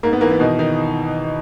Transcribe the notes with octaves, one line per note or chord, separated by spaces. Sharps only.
G#2 A#3
B3
E3 A#3
B3
B2 D#3 D#4
D#3 D#4